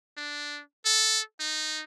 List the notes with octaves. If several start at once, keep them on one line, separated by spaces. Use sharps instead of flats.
D4
A4
D#4